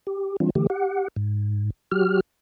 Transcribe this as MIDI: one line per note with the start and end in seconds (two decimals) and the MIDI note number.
0.07 0.36 67
0.40 0.50 52
0.40 0.50 55
0.40 0.50 60
0.40 0.50 62
0.40 0.50 65
0.55 0.67 50
0.55 0.67 52
0.55 0.67 57
0.55 0.67 67
0.70 1.08 67
0.70 1.08 78
1.16 1.70 44
1.91 2.20 54
1.91 2.20 66
1.91 2.20 67
1.91 2.20 89